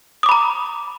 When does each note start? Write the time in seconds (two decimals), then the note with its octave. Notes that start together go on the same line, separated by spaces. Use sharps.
0.23 D#6
0.26 D6
0.29 B5
0.32 A#5